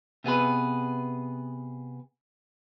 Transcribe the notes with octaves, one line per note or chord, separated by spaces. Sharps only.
C3 B3 G#4 B4